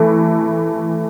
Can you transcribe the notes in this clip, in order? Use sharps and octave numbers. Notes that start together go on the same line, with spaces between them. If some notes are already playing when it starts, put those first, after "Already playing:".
Already playing: E3 A3 E4